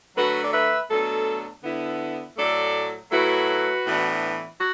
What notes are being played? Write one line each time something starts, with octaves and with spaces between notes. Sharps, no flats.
D3 F#3 A3 F#4 B4
D5
B4 E5
B2 F#3 A3 D4 A4
D3 B3 E4
A2 F#3 A3 A4 D5
A2 F#3 A3 E4 F#4 B4
A2 E3 B3 D4
F#4